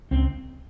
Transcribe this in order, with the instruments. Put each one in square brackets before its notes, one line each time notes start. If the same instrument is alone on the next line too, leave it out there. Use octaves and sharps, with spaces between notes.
[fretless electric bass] C#2 C4